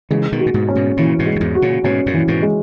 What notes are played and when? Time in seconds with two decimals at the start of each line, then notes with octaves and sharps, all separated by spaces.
0.11 C#3 E3 G#3
0.32 B2 D#3
0.40 F#4
0.46 A#2
0.54 G#2 B2
0.69 C#4
0.76 G#2 B2
0.97 A#2 C#3 E3
1.19 G#2 B2
1.26 G#3
1.36 F#2
1.40 E2 G#2
1.55 F#4
1.62 A#2 C#3
1.84 G#2 B2 C#4
2.06 F#2 A#2
2.13 E3
2.28 G#2 B2
2.42 G#3